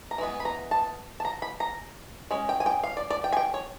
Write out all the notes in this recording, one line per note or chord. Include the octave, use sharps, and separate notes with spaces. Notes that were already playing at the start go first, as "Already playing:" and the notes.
A#5
E3 G#3 B3
B5
A#5
A5
A5
A#5
B5
A#5
G#3 C#4
G5
G#5
G5
F5
D5
D5
G5
G#5
G5
C#5